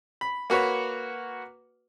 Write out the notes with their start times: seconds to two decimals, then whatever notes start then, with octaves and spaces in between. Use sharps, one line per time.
0.21 B5
0.50 A#3 F#4 B4 C#5